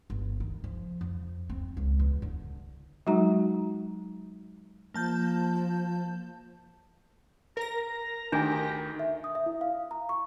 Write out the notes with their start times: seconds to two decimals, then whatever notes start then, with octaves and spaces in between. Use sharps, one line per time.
0.10 G1
0.40 D#3
0.64 F3
1.01 F2
1.50 C4
1.77 C#2
1.99 E2
2.22 D3
3.07 F#3 G#3 D#4 F#4 A#5
4.94 F3 A#3 A5 G6
7.57 A#4 A#5 A#6
8.32 D2 D#3 D4 G4 G#5
8.99 E5
9.24 D#6
9.35 E5
9.46 E4
9.61 F5
9.91 A#5
10.09 C#6